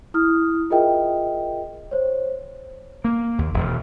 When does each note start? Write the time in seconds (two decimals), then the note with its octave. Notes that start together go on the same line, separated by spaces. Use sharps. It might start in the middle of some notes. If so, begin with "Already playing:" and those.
0.14 E4 D#6 F6
0.70 F4 G#4 A#4 D#5 E5 G5
1.91 C5 C#5
3.04 A#3
3.38 D#2
3.54 E1